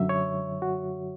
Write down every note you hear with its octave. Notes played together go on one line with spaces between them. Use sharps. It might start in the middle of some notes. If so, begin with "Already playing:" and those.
Already playing: F#2 D3 F#3 E5
C#5
F#4